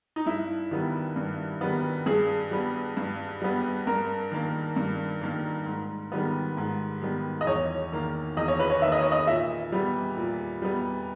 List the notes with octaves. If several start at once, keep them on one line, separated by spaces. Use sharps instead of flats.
D#4
G2 E4
D#3 G3 B3
G2
D#3 G3 B3
G2 G#4
G3 B3
G2
G3 B3
G2 A#4
D#3 A#3
G2
D#3 A#3
G#2
D#3 G3 B3
G#2
D#3 G3 B3
D#5
E2 C#5
D#3 A#3
E2 D#5
C#5
B4
C#5
D#3 A#3 E5
D#5
C#5
D#5
A#2 E5
G3 B3
A#2
G3 B3